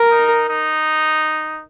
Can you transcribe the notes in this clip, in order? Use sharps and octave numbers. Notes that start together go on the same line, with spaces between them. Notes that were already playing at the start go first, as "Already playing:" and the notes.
Already playing: A#4
D#4
D#4